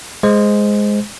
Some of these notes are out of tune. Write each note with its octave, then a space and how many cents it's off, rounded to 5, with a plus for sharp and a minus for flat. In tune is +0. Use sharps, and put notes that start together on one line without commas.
G#3 +0 C5 -10